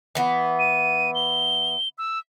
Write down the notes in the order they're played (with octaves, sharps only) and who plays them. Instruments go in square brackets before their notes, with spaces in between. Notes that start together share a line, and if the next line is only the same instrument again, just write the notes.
[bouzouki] E3 B3
[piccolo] D#7
G7
E6